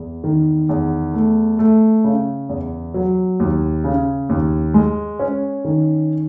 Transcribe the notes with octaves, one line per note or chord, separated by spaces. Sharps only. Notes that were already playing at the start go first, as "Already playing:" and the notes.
Already playing: E2
D#3
E2
A3
A3
C#3
E2
F#3
D#2
C#3
D#2
G#3
C#4
D#3